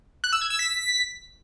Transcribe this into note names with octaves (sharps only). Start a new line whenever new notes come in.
F#6
E6
G#6
E6
B6